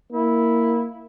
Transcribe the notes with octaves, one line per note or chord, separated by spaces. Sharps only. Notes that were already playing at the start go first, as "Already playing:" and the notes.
A#3 E4